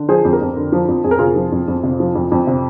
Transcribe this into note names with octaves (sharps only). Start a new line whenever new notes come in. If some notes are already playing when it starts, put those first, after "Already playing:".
Already playing: D3
F3 G#4 C5
F2
G4 A#4
F2
D3
F3
F2
F2 G#4
A#4
C3 F4 G#4
F3
F2
F2
C3
F3
F2
F2
C3